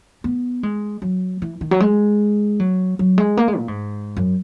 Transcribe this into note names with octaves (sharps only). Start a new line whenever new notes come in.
B3
G#3
F#3
E3
D#3
F#3
G#3
F#3
F#3
G#3
A#3
G#3
A#2
G#2
F#2